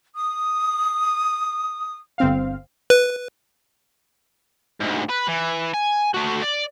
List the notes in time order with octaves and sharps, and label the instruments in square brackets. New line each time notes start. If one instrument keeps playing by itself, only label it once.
[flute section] D#6
[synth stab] G1 C4 F5
[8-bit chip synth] B4
[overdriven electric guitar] D2 G#2
B4
E3
G#5
A3 F#4
D5